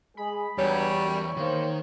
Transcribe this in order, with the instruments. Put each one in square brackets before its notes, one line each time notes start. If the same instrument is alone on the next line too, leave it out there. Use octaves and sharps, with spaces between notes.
[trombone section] G#3 G#4 [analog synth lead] B5
[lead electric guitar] E2 [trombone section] G2 F#3 [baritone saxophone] G3 [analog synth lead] C#5
[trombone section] F#2
[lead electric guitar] D#3 [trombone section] A#3 C5